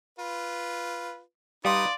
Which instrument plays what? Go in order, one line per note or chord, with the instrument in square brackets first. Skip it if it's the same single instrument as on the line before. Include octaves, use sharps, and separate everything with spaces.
[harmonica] F4 B4
[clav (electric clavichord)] G3 [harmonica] D#4 B4 D#6 [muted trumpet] D5 [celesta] F5 C6